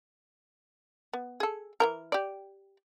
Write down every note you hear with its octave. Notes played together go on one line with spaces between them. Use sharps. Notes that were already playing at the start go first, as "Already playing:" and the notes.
B3
G#4 A4
E3 G3 A#4
G4 D5